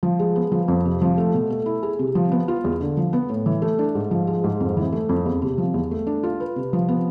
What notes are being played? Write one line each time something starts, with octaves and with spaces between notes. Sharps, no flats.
F3
G#3
B3
F3
F2
C3
F3
A3
B2
A3
E4
G#4
C3
F3
B3
F4
E2
D3
F3
B3
A2
E3
A3
D4
G#2
F3
G#3
G#2
F2
E3
A3
F2
E2
C3
F3
E2
A3
D4
F4
B4
C3
F3
B3